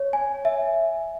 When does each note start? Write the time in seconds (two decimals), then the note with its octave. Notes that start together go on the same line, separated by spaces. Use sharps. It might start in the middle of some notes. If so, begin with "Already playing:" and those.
Already playing: C#5
0.13 G#5
0.45 E5